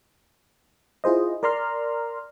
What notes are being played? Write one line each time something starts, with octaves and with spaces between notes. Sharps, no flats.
E4 F4 G#4 C5 D#5
A#4 D5 A#5 C6 F6